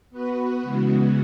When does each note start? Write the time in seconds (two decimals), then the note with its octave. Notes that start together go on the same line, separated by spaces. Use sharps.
0.11 B3 F#4 B4
0.62 C#3 E3 G#3 B3 F#4